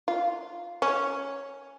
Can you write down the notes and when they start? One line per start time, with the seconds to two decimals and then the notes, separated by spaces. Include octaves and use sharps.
0.08 F4
0.82 C#4